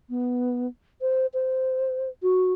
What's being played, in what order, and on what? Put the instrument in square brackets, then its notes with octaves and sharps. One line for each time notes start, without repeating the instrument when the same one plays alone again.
[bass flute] B3
C5
C5
F#4